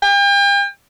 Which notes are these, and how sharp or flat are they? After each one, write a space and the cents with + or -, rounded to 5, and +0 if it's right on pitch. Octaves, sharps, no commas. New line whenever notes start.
G5 +40